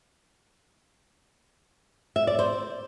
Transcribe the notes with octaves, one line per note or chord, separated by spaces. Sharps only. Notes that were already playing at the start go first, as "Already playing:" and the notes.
E5
D5
C5